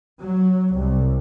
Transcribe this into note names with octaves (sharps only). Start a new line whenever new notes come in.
F#3
C2